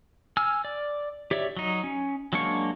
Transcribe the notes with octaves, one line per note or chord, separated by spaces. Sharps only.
G#5 E6 F6
D5
G4 C#5 D5 E5
F#3 D#4
C#4
F#3 G#3 A#3 D4 C#6